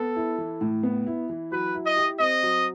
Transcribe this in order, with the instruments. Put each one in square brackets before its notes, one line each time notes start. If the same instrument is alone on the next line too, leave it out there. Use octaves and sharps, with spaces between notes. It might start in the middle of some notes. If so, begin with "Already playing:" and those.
Already playing: [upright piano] B3 [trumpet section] A4
[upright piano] E4
E3
A2
B3
E4
E3
[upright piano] F#3 [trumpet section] B4
[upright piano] E4
[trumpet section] D#5
[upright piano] G4
[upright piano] C4 [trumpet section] D#5
[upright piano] F#3